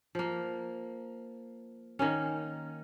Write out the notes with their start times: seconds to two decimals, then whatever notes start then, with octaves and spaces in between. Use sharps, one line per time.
0.15 F3 A#3
1.99 D#3 A#3 C#4